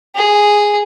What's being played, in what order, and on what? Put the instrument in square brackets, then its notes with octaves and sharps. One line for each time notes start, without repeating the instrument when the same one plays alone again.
[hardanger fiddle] G#4